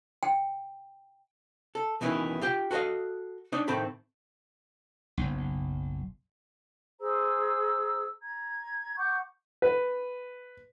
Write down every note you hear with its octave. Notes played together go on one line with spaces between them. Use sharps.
G5
A4
B1 B2 D#3 E3 C#4 E4
F4 G4 G5
F#4 A4 C5 D#5 F5
D4 D#4 C#5 D#5
A2 D#3 C4 A4 B5
F#1 B1
G#4 C5 A#5 E6
A#5 G#6
F#5 C#6 D6 G6
B4